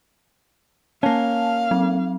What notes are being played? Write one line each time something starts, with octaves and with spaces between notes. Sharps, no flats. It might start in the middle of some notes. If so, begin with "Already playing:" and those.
A#3 C#4 F5 A5
F#3 C4